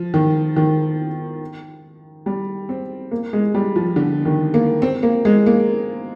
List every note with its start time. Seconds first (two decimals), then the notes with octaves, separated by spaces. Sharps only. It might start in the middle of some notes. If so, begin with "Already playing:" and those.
Already playing: F3
0.14 D#3
0.56 D#3
2.26 G3
2.69 C4
3.11 A#3
3.33 G#3
3.55 G3
3.76 F3
3.96 D3
4.25 D#3
4.54 A#3
4.82 C4
5.03 A#3
5.25 G#3
5.46 A#3